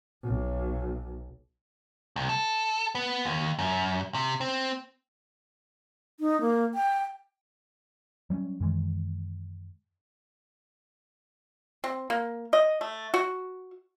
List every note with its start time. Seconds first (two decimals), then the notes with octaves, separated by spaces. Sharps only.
0.24 B1
2.16 C2
2.29 A4
2.95 B3
3.25 D#2
3.59 F#2
4.14 C3
4.41 C4
6.20 D#4
6.41 A#3
6.74 G5
8.30 F#3 G3 C4 C#4
8.60 F#2 D#3 E3 G#3
11.84 C4
12.10 A#3
12.53 D#5
12.81 A3
13.14 F#4